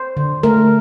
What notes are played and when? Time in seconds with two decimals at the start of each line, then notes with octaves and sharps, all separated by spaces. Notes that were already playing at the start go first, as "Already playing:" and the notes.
Already playing: C5
0.17 D3
0.43 A3 A#4